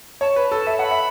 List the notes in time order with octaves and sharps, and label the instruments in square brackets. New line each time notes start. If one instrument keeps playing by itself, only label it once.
[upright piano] C#5 [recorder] A5
[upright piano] B4
A4
E5
[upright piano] F#5 [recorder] B5
[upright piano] E5